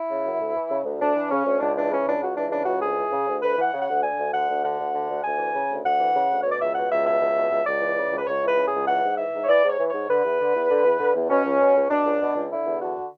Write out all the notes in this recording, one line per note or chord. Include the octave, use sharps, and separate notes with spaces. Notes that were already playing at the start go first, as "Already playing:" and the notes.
Already playing: E4
C#3
F#2
D2
E3
C#3
D2
D2 D4
E3
C#3 C#4
D2
C#2 D4
E3 D4
C#3 C#4
C#2 D4
C#2 F#4
E3 D4
C#3 D4
C#2 F#4
D2 G#4
E3
C#3
D2
D2 B4
E3 F#5
C#3
F#5
D2
D3 G#5
D2
D3 F#5
D2
D3 F#5
D2
D3
D2
D2 G#5
E3
C#3
D2
D2 F#5
E3
C#3
D2
B2 C#5
D5
C#2 E5
B2 F#5
C#2 E5
B2 E5
C#2
B2
C#2
C#2 D5
E3
C#3
C#2
B4
C#2 C#5
E3 B4
C#3
C#2 G#4
E3 F#5
G#2
E3 E5
G#2
C#5
E3 D5
G#2
C#5
E3
G#2 C#5
D3 B4
E2
D3
E2
D3
E2
D3
E2
B2 C#4
C#2
B2
C#2
B2 D4
C#2
B2
C#2
D3 E4
E2
D3 F#4